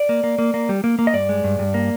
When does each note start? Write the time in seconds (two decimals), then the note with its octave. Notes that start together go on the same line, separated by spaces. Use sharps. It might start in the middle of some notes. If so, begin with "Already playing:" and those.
Already playing: D5
0.09 A#3
0.24 A#3
0.39 A#3
0.54 A#3
0.69 G3
0.84 A#3
0.99 A#3
1.07 D#5
1.14 G2 D5
1.29 G#3
1.44 G2
1.59 G2
1.74 A#3